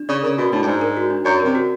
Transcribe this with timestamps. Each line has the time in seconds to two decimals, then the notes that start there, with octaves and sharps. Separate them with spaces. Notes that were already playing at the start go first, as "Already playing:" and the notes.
Already playing: D4
0.09 C#3 D5
0.23 C#3 A#4
0.38 B2 F#4
0.52 A2 D4
0.62 G2
0.67 G#2 D5
0.81 A#4
0.97 F#4
1.10 D4
1.25 F#2 D5
1.40 C3 A#4
1.55 F#4